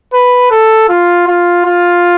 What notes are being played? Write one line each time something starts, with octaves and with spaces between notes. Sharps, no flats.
B4
A4
F4
F4
F4